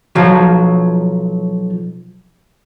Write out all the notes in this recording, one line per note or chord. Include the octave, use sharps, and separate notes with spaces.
B1 F3 F#3